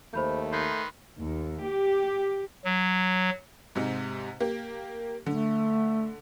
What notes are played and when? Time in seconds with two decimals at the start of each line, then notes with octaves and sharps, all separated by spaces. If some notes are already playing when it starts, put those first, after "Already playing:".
0.14 D#2 A3 C5 B5 G6
0.53 D#3 B4 C6 G6
1.19 D#2
1.64 G4
2.65 F#3
3.75 G#2 C3 D#4
4.40 A#3 G4
5.26 D3 A3